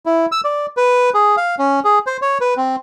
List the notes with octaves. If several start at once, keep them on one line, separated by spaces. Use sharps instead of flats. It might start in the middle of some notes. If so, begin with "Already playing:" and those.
E4
E6
D5
B4
G#4
F5
C#4
G#4
C5
C#5
B4
C4